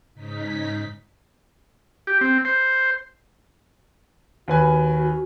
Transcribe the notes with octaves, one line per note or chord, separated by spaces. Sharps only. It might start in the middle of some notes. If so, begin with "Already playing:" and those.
G#2 C#3 D#4 B6
G4
C4
C5
D#2 F#4 B4 G#5